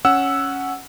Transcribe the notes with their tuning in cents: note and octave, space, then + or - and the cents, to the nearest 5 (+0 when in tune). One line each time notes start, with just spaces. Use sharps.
C#4 +0 F#5 +0 E6 +0